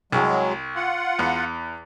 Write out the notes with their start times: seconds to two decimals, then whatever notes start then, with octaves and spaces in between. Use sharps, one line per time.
0.12 C2 F#3 G#3
0.76 F4 F#5
1.19 E2